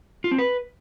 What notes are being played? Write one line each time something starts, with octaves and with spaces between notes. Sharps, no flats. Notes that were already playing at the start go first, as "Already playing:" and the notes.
F4
C4
B4